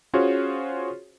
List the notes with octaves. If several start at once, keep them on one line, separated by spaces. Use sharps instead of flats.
C#4 F4 F#4 G#4 C5 C#5